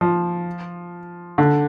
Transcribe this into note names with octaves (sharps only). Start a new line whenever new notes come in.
F3
D3